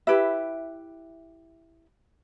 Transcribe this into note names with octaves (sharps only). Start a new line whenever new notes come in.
E4 G4 B4 E5